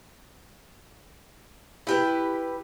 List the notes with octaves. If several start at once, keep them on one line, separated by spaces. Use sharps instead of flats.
E4 G4 B4